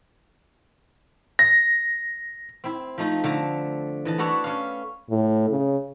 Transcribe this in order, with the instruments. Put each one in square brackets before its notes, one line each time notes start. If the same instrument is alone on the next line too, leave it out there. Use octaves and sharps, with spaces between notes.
[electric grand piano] A#6
[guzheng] C4 E4
F3 A3 D#4
D3 A3 A5 A#5
E3 D#5 A5
B3 D4 F#4 A4 C#5
C#4 F5
[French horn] A2
C#3